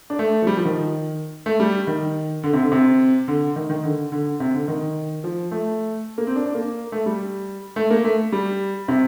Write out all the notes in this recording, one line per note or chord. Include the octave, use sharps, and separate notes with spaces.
D4
A3
F3
G3
F3
D#3
A3
G3
D#3
D3
C3
D3
C3
D3
D#3
D#3
D3
D3
C3
D3
D#3
F3
A3
A#3
C4
D4
D4
A#3
A3
G3
A3
A#3
A3
G3
C3